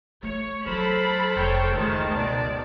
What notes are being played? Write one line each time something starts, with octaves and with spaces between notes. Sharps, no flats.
A3 C#5
F#3 A4 A#4 C5 B5
F1 D3 C#5 G5
C#2 D#3 G#3 A3 A5
B2 D5